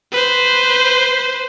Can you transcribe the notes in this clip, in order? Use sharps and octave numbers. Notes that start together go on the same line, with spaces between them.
B4 C5